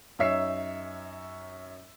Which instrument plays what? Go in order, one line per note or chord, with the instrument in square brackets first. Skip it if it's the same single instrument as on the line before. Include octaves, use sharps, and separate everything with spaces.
[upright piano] F#2 D#4 C#5 E5 E6 C7